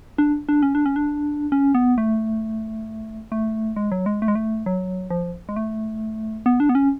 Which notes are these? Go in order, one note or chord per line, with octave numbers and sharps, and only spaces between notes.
D4
D4
C#4
D4
C#4
D4
C#4
B3
A3
A3
G#3
F#3
G#3
A3
G#3
A3
F#3
F3
G#3
A3
B3
D4
B3
C#4